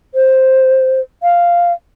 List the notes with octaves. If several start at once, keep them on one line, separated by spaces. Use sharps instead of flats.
C5
F5